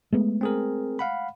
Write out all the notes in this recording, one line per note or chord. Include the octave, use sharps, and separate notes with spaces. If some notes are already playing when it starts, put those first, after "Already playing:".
G#3 A3 B3
C4 G#4 A#4
F5 F#5 B5